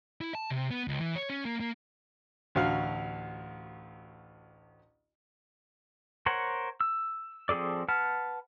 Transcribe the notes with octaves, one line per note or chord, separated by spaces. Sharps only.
E4
A5
C3
B3
C#2
E3
C#5
C#4
A#3
A#3
A1 D2 F#4 F5 F6
A#4 C5 C#5 F#5
E6
F3 C4 G#4 A4 D5
B4 F#5 A5 F6